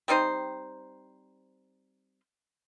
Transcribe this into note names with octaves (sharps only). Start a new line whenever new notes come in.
G3 C4 D#4 C5